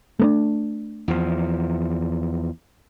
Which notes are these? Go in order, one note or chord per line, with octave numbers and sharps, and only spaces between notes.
A3 B3 D4
E2 F3